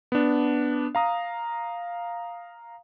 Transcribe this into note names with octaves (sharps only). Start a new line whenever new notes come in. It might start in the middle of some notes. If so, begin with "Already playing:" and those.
B3 D4
F5 A#5 D#6